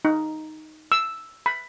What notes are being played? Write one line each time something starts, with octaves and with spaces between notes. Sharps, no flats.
D#4
E6
B5